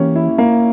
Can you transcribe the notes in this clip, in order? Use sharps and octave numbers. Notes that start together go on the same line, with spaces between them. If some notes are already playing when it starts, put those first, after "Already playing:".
Already playing: E3 A#3 C#4 G4
E4
A#3